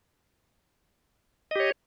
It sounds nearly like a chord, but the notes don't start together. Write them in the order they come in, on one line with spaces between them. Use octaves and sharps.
D#5 G4 C#5